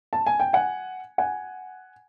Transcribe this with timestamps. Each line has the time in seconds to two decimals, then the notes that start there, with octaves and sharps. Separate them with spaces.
0.13 A5
0.26 G#5
0.40 G5
0.53 F#5 G#5
1.18 F#5 G#5